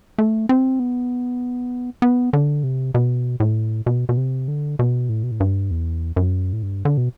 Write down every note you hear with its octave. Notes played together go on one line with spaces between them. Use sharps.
A3
C4
B3
B3
D3
C3
B2
A2
B2
B2
C3
D3
B2
A2
B2
A2
G2
E2
F#2
A2
G2
D3
B2